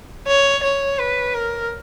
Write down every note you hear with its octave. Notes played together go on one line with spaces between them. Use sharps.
C#5
C#5
B4
A#4